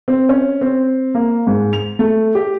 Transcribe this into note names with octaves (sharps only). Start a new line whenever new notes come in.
C4
C#4
C4
A#3
G#2
F7
A3
G4